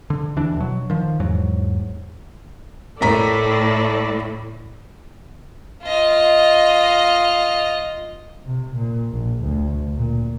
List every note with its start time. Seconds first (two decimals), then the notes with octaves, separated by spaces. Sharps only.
0.10 D3
0.36 D#2 E3 D4
0.57 B2 F#3
0.90 D#3 F3
1.20 E2 G#2 F#3
3.01 A2 A4 A#4 D5 A#5 B6
5.84 F4 D#5
8.46 C3
8.75 A#2
9.11 A#1
9.43 D2
9.97 A#2